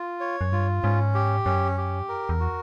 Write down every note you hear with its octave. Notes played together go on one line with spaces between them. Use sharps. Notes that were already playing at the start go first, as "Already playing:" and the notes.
Already playing: F4
C#5
F#2
G2 F4
G#2 C#4
G4
F#2 C#4
G4
A#4
E2
F#4